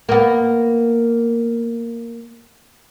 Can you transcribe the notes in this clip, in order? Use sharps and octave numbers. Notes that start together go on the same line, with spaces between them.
A#3 B3